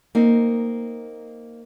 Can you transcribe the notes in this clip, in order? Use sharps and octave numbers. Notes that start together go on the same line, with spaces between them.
A#3 C4 D#4